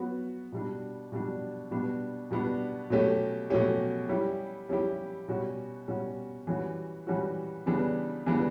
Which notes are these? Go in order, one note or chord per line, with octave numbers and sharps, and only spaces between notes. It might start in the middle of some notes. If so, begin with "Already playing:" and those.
Already playing: F#3 B3 F#4
B2 G3 D4
B2 G3 D4
B2 G3 B3 D4
B2 G3 B3 D4
B2 F#3 A3 C#4 G4
B2 F#3 A3 C#4 G4
G3 C#4 E4 G4
G3 C#4 E4 G4
B2 G3 C#4 F#4
B2 G3 C#4 F#4
E3 G3 C#4 F#4
E3 G3 C#4 F#4
C#3 E3 G3 B3 D4
C#3 E3 G3 B3 D4